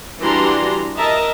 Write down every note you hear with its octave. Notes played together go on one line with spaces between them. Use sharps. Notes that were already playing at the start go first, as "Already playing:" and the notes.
E3 G3 D4 F#4 A#5 C6
A#4 D#5 E5 A5 A#5